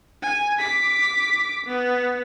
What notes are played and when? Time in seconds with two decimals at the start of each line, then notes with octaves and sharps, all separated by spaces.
0.22 G#5
0.59 D6 B6
1.67 B3